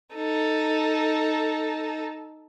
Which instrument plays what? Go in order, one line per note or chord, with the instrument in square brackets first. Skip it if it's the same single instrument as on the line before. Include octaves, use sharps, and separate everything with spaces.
[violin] D#4 A4